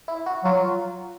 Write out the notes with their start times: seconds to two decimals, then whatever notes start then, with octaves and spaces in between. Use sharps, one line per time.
0.08 E4
0.26 F#4
0.45 F#3 F4